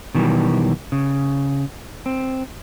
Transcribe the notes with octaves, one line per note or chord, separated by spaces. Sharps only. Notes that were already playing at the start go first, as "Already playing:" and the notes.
B2 D#3 E3 F#3 G3
C#3
C4